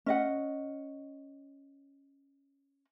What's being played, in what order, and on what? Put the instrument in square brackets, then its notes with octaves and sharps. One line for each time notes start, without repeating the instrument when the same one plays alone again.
[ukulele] C#4 D#5 F#5